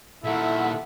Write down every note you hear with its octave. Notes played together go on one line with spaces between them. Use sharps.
A#2 D#3 E4 A4 E5 F#5